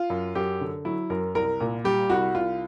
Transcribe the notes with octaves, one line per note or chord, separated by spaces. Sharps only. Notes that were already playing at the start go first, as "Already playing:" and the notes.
Already playing: F4
F#2
F#2 G4
D3
F#3 E4
F#2 A#4
C2 A#4
A#2
G3 G4
C2 F#4
C2 F4